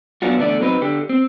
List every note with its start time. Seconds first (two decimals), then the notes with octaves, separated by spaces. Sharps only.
0.22 F#3 B3 C#4 D4 F4 F#4
0.38 E2 D3 A3 D4 D5
0.60 F#3 C4 D#4 B4
0.82 D3 G4
1.09 C4